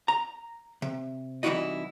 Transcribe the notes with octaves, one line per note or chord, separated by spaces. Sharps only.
A#5
C3
C2 E3 D#4 E4 F#4 D#5